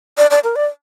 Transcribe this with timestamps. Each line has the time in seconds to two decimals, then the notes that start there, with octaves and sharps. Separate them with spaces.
0.18 D5
0.30 D5
0.44 A#4
0.56 D5